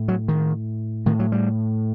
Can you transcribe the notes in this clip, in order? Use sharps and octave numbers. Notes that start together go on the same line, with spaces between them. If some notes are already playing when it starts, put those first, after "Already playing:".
Already playing: A2
F#3
D#3
A2 D#3
F#3
G3